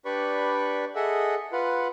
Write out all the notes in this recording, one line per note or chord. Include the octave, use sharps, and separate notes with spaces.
D4 G4 B4 D5 B5 C#6
G#4 A4 D#5 E5 F#5
F4 B4 F#5